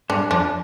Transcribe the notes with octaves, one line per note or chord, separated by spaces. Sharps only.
G2 D4
F2 D4